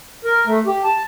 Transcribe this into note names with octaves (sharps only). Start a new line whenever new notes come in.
A#4
A3
G4
A5